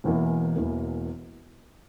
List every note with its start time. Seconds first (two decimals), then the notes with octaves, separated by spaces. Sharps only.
0.04 E1 E2 E3 A#3
0.56 E1 E2 E3 A#3